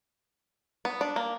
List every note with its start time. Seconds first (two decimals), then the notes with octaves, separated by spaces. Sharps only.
0.85 B3
1.01 D4
1.16 A#3